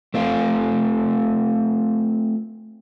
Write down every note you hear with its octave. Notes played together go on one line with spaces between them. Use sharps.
A3 C4 F4